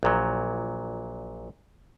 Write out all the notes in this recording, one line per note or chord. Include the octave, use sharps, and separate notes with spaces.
A#1 A#2 F#3